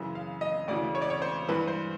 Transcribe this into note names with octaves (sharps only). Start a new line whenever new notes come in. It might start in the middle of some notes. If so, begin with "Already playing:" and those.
Already playing: F#2 C#3 E3
F5
D#5
D2 C#3 E3 D5
C#5
D5
C#5
C5
G2 E3 B4
C5